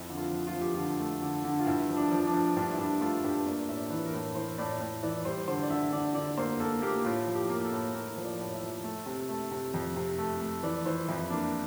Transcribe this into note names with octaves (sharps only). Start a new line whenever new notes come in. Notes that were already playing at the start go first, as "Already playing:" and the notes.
Already playing: F2 E4
D3
F4
F3
F4
F3
G4
D3 F4
A3
D3
D3
F4
G2 E4
F3
D4
F3
D4
F3
G2 D4
E4
G2 D4
A3 F4
G2 G4
A#3 D5
A2 E5
D5
E3
A#4
A2
E3 C5
A2 D5
A2
E3 D5
G3 C5
D3 C5
D5
D3 E5
D3 D5
D3 D5
A#3 C5
A#3 A4
A#3 G4
A2 F4
F3
G4
A#3
A4
A2
A#3 A#4
F3 C5
D5
A2
E5
F3
A3
C3
A3
C3
F2
C3
A3
A3
E3 D5
E3 C5
F2 E4
A#3 D4